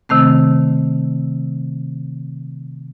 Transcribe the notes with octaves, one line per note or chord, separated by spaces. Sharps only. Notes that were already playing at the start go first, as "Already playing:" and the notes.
C3 D#3 A3 C4